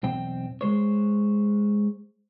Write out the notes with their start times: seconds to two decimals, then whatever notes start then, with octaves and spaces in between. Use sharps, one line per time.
0.03 B1 E2 C4 G5
0.61 G#3 C5 C#5